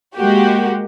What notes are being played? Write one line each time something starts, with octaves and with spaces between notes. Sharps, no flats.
G#3 A#3 F#4 G4